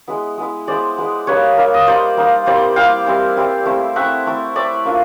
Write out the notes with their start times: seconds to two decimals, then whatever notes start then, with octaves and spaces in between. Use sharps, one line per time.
0.08 G#3 B3 E4
0.38 G#3 B3 E4
0.67 G#3 B3 E4 C5 D5
0.98 G#3 B3 E4
1.27 G3 A#3 D#4 B4 C#5
1.57 G3 A#3 D#4 E5
1.74 D#5
1.87 G3 A#3 D#4 C5 D5
2.17 G3 A#3 D#4
2.46 G3 C4 E4 C5 D5
2.76 G3 C4 E4 F5 G5
3.06 G3 C4 E4
3.36 G3 C4 E4
3.66 A3 C4 E4
3.96 A3 C4 E4 E5 F#5
4.26 A3 C4 E4
4.56 A3 C4 E4 D5 E5
4.85 A#3 D4 F4